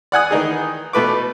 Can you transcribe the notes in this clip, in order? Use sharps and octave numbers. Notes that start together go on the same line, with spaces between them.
D5 F#5 G#5 D#6
D#3 E3 D#4 G#4
B2 A3 B4 D6